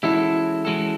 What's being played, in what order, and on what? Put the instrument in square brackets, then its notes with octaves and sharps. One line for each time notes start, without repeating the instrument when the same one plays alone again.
[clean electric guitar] E3 G#3 C#4 F#4 A4 [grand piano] E4
[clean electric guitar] E3 G#3 C#4 F#4 A4